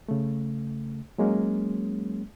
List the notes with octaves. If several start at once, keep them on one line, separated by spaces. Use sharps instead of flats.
C#3 A3
F#3 G#3 A#3 C#4